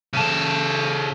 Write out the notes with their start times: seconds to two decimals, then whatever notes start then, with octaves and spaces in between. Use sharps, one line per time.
0.13 C#3 A4